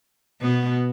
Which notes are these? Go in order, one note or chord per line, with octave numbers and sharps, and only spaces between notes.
B2 B3